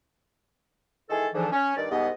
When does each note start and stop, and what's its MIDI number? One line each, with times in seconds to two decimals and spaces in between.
1.10 1.28 51
1.10 1.28 52
1.10 1.28 56
1.10 1.28 68
1.10 1.28 69
1.34 1.47 44
1.34 1.47 50
1.34 1.47 52
1.34 1.47 53
1.52 1.75 61
1.77 1.91 43
1.77 1.91 51
1.77 1.91 74
1.91 2.10 36
1.91 2.10 44
1.91 2.10 59
1.91 2.10 75